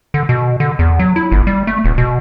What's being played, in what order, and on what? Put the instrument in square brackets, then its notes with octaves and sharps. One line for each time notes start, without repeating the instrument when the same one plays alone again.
[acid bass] D3
B2
D3
E2
F#3
E4
G1
G3
A3
D#1
B2